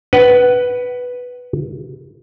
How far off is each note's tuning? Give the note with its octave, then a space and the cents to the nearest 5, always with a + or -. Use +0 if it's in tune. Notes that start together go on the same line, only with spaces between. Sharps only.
B4 +0 F#5 +30